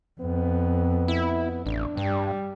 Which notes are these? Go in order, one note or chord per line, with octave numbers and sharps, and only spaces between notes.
F2 B3
E4
A1 D4
G2 G3